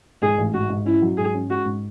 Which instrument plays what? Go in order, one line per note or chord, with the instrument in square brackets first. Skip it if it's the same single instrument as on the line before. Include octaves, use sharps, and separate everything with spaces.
[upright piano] G#2 [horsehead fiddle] G#4
[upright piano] A1
[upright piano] G#2 [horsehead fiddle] F#4
[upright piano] G#2
[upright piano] C#4 [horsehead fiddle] E4
[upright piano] F#3
[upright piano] G#2 [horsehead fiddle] G#4
[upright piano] C#4
[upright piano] G#3 [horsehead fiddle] F#4
[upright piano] G#2